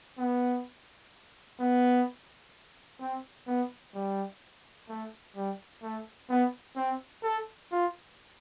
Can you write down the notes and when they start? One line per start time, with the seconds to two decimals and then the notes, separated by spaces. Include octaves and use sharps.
0.18 B3
1.60 B3
3.00 C4
3.47 B3
3.94 G3
4.89 A3
5.36 G3
5.82 A3
6.30 B3
6.76 C4
7.23 A4
7.71 F4